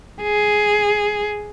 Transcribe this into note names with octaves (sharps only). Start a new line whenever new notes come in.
G#4